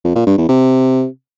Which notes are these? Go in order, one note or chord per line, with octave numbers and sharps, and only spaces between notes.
F2
A#2
G2
E2
C3